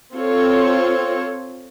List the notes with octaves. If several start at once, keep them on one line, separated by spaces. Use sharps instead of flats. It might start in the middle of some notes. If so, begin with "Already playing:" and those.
C4 F4 A4 C#5